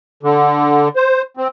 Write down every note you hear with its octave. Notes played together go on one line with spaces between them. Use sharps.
D3
C5
C4